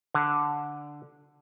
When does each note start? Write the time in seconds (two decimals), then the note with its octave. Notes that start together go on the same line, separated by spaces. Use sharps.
0.15 D3